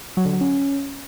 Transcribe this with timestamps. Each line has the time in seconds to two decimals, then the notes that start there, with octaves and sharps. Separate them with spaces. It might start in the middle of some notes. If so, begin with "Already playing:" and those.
0.17 F#3
0.25 D3
0.33 F#3
0.41 C#4